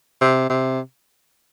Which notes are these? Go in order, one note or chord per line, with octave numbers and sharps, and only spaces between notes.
C3
C3